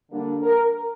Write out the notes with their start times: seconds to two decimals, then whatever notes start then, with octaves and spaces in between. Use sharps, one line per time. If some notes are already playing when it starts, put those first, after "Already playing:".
0.09 D3 G3 A#3 D4
0.42 A#4